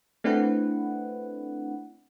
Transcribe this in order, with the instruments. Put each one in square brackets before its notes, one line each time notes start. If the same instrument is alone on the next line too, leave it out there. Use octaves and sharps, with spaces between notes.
[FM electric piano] A3 C4 D4 E4 B4 F#5